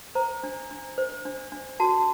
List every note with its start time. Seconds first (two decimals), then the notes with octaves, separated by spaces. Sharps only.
0.15 C5 A#5
0.44 D4
0.71 D4
0.98 C5
1.25 D4
1.52 D4
1.80 F#4 A5